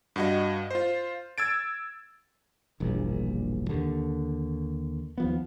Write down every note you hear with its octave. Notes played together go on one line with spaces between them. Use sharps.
G2 F#4 D#5
F4 C5
E6 G#6 A6 D7
E1 A#1 G2 A#2
D#2 D3
D#2 F3 B3